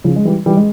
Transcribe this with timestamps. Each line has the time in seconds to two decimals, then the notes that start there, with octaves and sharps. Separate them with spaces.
0.04 C#3 F3
0.16 G#3
0.25 E3 G3
0.46 E3 G3
0.57 G#3